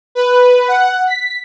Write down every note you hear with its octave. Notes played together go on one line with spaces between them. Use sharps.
B4
F#5
B6